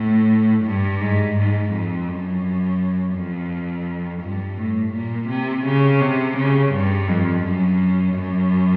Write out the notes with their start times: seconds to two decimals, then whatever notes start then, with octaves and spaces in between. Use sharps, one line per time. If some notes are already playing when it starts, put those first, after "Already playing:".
Already playing: A2
0.66 G2
1.01 G#2
1.37 G#2
1.73 F2
2.08 F#2
3.16 F2
4.23 G2
4.58 A2
4.93 A#2
5.29 C3
5.66 C#3
6.01 C3
6.38 C#3
6.73 G2
7.08 F2
7.44 F#2
8.15 F#2